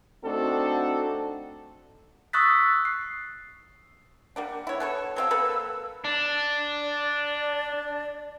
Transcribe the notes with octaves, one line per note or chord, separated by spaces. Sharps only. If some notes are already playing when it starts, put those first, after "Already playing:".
A3 C4 D4 D#4 F#4 A4
C#6 D#6 E6 F#6 A6 B6
C7
G3 A#3 D4 F#5
E4 C#5
B3 A4 C#5 A5
F#3 C4 F5 E6
A#3 A4 B4
D4
D5